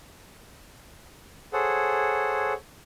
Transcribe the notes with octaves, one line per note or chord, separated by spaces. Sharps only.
G#4 A4 C5 C#5 F#5